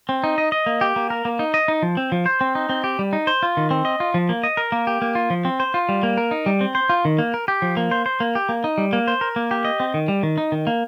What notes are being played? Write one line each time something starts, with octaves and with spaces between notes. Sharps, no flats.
C4
D#4
D#5
D#5
A#3
G4
A#3
A#4
A#3
D#4
D#5
D#4
F3
C4
F3
C5
C4
D#4
C4
G4
G3
D#4
C5
F4
D#3
C4
D#5
F4
F3
A#3
D#5
A#4
A#3
G4
A#3
F4
F3
C4
C5
F4
G3
A#3
A#4
D#4
G3
C4
C5
F4
D#3
A#3
A#4
G4
F3
A#3
C5
C5
A#3
G4
A#3
D#4
G3
A#3
C5
A#4
A#3
G4
D#5
C4
D#3
G3
D#3
D#4
D#3
A#3